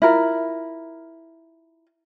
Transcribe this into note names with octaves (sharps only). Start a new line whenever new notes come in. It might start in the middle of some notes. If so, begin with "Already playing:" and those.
E4 F4 A#4